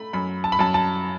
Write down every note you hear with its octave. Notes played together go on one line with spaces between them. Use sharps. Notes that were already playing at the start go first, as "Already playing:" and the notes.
Already playing: A3 B5
F#2 B5
A5
B5
F#2 A5
A5